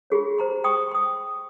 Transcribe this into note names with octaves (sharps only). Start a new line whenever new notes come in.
F4 G4 G#4 C#5
C5 A#5 C6
G5 C6 C#6 D#6
C6 D#6